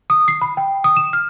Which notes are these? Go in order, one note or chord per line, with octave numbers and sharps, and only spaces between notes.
D#6
C7
B5
G5
D#6
E7
F6